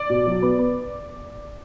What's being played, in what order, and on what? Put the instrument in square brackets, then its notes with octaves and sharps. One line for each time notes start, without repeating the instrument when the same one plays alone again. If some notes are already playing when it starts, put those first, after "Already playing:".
Already playing: [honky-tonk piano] D5
[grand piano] B2
F#3
B3
B3